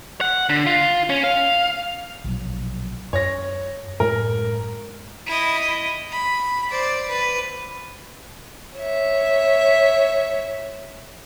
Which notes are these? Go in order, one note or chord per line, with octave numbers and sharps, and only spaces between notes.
F#5
D3
F4
C#4
F5
A#1 B2 F#3
F#2 C#5 A#6
F#2 A2 G#3 A#4
E4 D#5
B5
C5 D5
B4
C#5 E5